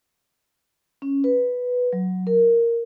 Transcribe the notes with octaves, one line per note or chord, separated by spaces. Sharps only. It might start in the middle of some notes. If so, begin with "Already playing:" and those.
C#4
B4
F#3
A#4